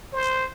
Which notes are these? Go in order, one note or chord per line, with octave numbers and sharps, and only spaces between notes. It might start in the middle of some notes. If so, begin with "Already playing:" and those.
C5